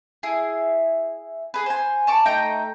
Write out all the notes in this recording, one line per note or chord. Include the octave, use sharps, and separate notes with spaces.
E4 G#4
G#4 B4
C5 G#5
A5 C#6 D6
A3 D#4 G5 A#5